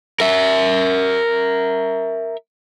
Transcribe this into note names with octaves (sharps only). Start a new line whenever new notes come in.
A#4 E5